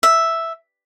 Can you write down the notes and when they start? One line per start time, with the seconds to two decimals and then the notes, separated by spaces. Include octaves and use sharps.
0.03 E5